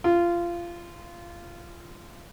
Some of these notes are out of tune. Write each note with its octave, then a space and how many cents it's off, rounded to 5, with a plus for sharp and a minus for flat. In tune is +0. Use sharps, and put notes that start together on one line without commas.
F4 -20